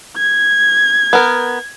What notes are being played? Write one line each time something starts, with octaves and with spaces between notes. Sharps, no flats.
G#6
B3 A#4